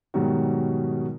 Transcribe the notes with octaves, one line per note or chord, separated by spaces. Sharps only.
G#2 B2 D#3 F#3 G3 F#4